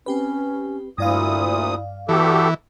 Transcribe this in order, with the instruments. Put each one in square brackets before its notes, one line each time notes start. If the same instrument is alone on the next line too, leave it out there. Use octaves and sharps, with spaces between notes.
[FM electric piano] C4 G4 B4 [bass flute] C#4
[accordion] D2 A#2 D#6 [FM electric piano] G2 D5 F5 [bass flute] E4
[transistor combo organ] E3 [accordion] B3 G4 A4 [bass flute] F#4